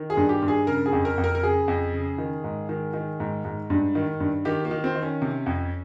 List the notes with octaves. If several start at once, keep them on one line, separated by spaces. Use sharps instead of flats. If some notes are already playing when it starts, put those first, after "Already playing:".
Already playing: D#3
G#4
G2
G4
G2
G#4
C#3 A#4
G#4
F2
A#4
F2
A#4
A#4
C#3 G#4
F2
C#3
D#3
G#2
D#3
D#3
G#2
G#2
G2
D#3
G2
D#3 G4
A#3
D#3
C4
D#3
C#4
C3
F2